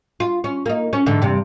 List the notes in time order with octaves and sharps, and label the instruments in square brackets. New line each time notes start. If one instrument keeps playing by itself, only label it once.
[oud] F4
C#4
A#3 D#4
C#4
G#2 D3 E3
E2 G2 C3